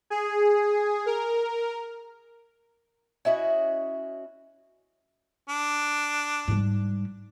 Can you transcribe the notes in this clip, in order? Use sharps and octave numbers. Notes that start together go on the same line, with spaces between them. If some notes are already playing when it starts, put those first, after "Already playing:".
G#4
A#4
C#4 E4 F#4 D#5
D4
G#2 G3